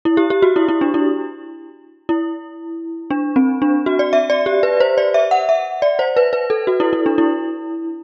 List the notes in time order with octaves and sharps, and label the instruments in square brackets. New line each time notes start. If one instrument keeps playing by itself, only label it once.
[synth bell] E4
G4
G4
F#4
E4
E4
D4
E4
E4
D4
C4
D4
F#4
D5
E5
D5
G4
B4
C5
D5
E5
F#5
E5
D5
C5
B4
B4
A4
F#4
E4
E4
D4
E4